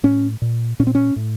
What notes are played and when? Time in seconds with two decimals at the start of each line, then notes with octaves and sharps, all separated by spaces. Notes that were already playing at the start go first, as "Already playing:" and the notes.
0.03 A2 C#4
0.42 A#2
0.79 A#2 C#4
0.87 C4
0.95 C#4
1.16 A2